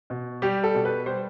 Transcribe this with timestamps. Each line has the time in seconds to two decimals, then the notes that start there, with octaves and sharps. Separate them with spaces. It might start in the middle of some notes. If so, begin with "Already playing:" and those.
0.10 B2
0.42 G3 G4
0.64 A4
0.75 B2
0.85 B4
1.06 G3 C5